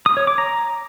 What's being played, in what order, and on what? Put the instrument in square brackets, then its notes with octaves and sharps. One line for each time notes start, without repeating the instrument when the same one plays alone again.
[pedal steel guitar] D#6
C#5
D6
A#5